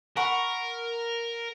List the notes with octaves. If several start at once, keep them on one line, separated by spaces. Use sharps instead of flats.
A#4 F#5 B5 C#6